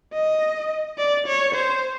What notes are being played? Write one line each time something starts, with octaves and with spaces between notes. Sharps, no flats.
D#5
D5
C#5
C5